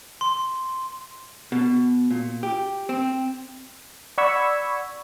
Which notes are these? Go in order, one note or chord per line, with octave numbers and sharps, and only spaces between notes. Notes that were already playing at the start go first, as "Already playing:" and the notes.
C6
B2
A#2
G4
C4
D5 F#5 B5 C#6 E6 G#6